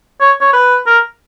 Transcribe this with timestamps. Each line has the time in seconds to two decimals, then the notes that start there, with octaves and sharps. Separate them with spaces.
0.21 C#5
0.41 C#5
0.53 B4
0.86 A#4